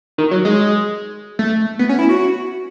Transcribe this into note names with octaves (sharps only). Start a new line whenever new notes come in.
D#3
F#3
G#3
A3
B3
C#4
E4
F#4